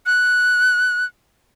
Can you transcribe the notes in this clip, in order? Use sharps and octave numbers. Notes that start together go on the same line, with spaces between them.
F#6